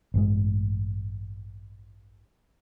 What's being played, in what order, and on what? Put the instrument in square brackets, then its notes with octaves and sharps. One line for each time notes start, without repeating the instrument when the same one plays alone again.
[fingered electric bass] A1 G2 G#3